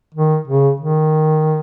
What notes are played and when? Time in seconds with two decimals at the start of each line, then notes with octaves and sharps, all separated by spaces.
0.15 D#3
0.48 C#3
0.80 D#3